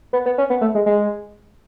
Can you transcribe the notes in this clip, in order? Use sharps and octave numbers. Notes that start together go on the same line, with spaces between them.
B3
B3
C#4
B3
A3
G#3
G#3